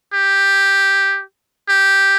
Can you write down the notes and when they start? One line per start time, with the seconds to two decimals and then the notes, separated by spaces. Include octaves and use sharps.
0.14 G4
1.69 G4